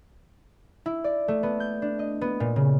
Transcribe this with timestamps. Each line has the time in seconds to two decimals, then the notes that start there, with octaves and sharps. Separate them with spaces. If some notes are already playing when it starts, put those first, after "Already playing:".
0.86 E4
1.04 D5
1.28 A3
1.43 B3
1.60 G6
1.82 D4
1.99 D#5
2.21 B3
2.40 A#2
2.56 C#3